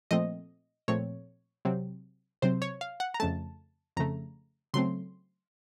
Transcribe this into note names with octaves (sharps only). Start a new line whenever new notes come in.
A#2 F3 A3 C4 D#5
A#2 F3 A3 C4 C#5
C3 F#3 C4
C3 F#3 C4 C5
C#5
F5
F#5
A#5
F2 C#3 A3 A5
F2 C#3 A3 A#5
C#3 F#3 A3 C4 C6